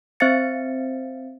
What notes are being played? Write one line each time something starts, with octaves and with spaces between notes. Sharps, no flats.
C4 C5 E5 F5 A6 C#7